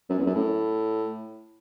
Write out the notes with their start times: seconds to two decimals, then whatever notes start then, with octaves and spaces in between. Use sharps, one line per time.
0.10 F#2
0.19 E2
0.26 F#2
0.35 A2